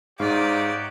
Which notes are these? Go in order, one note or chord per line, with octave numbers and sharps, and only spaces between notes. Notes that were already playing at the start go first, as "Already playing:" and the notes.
G#2 D#4 F#4 G4 C#5 D5 F5